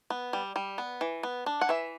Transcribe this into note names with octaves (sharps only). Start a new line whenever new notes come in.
B3
G3
G3
B3
E3
B3
D4
F#5
E3 E5